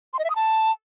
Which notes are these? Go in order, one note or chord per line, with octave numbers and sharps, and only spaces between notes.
C6
D#5
E5
D#6
A5